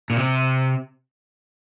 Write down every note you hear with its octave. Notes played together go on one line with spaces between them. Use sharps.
A#2
C3